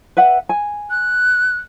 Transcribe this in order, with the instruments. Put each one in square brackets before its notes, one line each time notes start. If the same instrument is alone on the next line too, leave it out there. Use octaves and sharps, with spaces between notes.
[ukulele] B4 E5 F#5
G#5
[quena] F#6